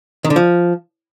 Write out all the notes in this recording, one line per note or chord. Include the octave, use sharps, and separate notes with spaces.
D#3
D3
F3